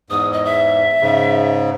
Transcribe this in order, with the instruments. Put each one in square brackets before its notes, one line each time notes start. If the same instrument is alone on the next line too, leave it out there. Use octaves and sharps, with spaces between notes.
[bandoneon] E2 G#2 [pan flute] D#6
[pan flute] D#5
E5
[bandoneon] G#2 C#3